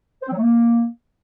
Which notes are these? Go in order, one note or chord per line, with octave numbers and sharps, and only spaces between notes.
C5
C4
F#3
A3
A#3